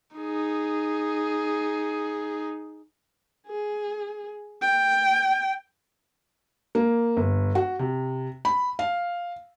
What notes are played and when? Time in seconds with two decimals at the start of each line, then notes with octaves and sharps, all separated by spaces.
0.16 D#4 G#4
3.47 G#4
4.61 G5
6.75 A#3
7.17 G1
7.55 F#4
7.79 C3
8.45 B5
8.79 F5